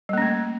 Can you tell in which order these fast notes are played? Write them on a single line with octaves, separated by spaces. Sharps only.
G3 A#3 C#4 A3